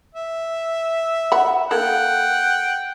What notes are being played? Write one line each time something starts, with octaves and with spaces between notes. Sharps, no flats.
E5
F#5 B5
A#3 A4 F#5 G5